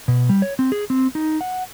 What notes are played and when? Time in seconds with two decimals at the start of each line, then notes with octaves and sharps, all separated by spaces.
0.08 B2
0.29 G3
0.42 C#5
0.59 C4
0.72 G#4
0.90 C4
1.15 D#4
1.41 F#5